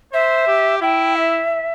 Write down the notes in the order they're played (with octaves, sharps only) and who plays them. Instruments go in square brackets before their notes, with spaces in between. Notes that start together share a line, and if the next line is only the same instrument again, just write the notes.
[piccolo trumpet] C5 [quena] E5
[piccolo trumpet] G4
[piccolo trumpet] E4 [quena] G5
[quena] E5